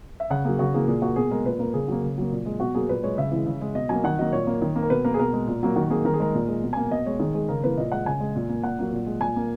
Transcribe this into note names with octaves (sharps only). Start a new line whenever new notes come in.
E5
C#3 F#5
F#3 A#3 G#4
C#3 F#4
E3 A#3 G#4
A#2 G#4
A#3 F#4
B2 G#4
G#3 A#4
A#2 B4
A#3 A#4
C#3 G#4
F#3 A#3
C#3
F#3 A#3
A#2
G#3
B2 F#4
F#3 A#3 G#4
A#2 B4
G#3 C#5
C#3 E5
E3 G#3
C#3
G#3
B2 D#5
F#3 A#3 G#5
D#3 F#5
F#3 A#3 D#5
A#2 C#5
A#3
D#3
A#3
A#4
B2 B4
A#3 A#4
G#4
B2 A#4
G#3
A#2
F#3 A#3
D#3 F#4
A#3 G#4
D#3 A#4
G#4
G#3 A#4
A#2
G#3
B2
G#5
A#3
B2 D#5
G#3 C#5
D#3 G#4
G#3 G#4
C#3 A#4
E3 A#3 B4
A#2 D#5
G#3 F#5
C#3 G#5
G#3
A#2
A#3
A#2 F#5
F#3 A#3
A#2
G#3
A#2 G#5
A#3